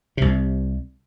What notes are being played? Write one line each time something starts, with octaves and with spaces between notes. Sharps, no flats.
C2 C3